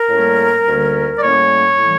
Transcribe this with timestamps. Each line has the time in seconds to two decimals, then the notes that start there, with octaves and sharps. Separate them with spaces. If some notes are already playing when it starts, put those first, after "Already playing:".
Already playing: A#4
0.09 A2 G3 A#3 C#4
0.66 D2 D3 G3 A#3 C#4
1.17 D5
1.22 A2 G3 A#3 C#4 C#5
1.78 A2 E3 G3